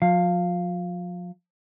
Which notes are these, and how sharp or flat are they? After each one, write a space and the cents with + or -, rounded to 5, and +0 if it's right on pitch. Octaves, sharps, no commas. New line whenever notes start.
F3 +40 F5 +0